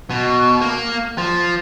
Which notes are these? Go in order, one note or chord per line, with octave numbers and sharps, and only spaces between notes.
B2
A#3
F3